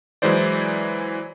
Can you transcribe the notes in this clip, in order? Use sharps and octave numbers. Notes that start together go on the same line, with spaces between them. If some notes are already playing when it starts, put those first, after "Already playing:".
E3 F#3 G#3 E4 C5 D5